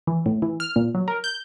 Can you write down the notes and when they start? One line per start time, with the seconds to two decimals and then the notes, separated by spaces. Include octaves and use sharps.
0.07 E3
0.26 A2
0.42 E3
0.60 F6
0.76 A#2
0.95 F#3
1.08 A#4
1.24 G6